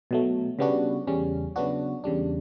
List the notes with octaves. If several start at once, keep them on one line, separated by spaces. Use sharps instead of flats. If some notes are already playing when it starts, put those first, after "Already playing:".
B2 F#3 A3
C#3 G3 B3 D4 F#4
E2 C#3 G3 C#4
C#3 F#3 B3 D4 F#4
E2 C#3 G3 D4